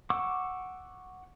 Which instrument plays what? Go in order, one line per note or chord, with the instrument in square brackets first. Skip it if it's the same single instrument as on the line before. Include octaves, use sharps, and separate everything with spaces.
[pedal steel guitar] F#5 C#6 D6 E6